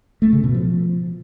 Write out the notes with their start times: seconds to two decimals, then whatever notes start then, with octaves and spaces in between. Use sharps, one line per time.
0.22 A3
0.33 C#3
0.44 B2
0.54 F3